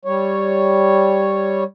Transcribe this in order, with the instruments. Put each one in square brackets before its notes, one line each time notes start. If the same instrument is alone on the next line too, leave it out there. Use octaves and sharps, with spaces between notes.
[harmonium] G3 C#5